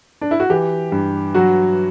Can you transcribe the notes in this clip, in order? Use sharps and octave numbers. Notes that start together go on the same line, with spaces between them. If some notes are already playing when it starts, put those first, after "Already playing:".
D4
E4
F#4
E3 G4
G2
F#3 F#4